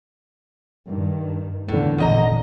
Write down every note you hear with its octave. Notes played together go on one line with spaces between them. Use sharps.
G2 D#3
E2 A2 D3
G#1 E2 A#2 D3 D#5 A#5